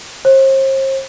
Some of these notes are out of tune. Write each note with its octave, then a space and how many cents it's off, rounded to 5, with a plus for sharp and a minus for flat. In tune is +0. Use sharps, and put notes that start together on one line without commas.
C5 +40